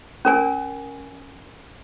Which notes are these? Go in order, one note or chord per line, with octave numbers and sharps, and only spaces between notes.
C#4 A#4 G#5